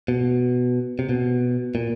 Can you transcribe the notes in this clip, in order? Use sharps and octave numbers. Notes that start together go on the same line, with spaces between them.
B2
C3
B2
A#2